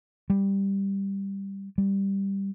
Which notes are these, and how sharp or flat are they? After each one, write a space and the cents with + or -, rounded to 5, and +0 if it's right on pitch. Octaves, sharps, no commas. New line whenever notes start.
G3 +5
G3 +5